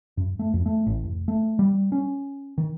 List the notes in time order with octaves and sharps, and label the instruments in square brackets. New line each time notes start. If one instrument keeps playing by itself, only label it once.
[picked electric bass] F#2
A3
F2
A3
A1
F1
A3
G3
C#4
D#3